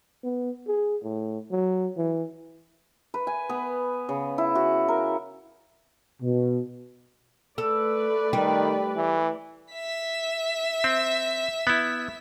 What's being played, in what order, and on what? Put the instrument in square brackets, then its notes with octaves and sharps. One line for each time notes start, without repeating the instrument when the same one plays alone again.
[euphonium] B3
G#4
A2
F#3
E3
[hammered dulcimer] B4
G#5
B3
C#3
E4
F#4
A#4
[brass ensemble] B2
[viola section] A3 B4 D5 [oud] A4
[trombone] D#3 [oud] G3
[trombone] E3
[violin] E5 B6
[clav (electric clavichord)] C4
B3 E4